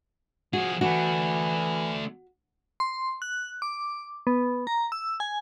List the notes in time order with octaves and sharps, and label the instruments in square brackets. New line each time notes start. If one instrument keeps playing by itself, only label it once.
[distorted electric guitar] F3 G#4 [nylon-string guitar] F#4
[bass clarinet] E3 [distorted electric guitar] A3 D4 [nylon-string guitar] F#4
[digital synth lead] C6
F#6
D6
B3
A#5
E6
G#5